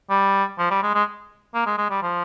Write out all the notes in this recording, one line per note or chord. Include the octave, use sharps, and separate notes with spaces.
G3
F3
G3
G#3
G#3
A#3
G#3
G#3
G3
F3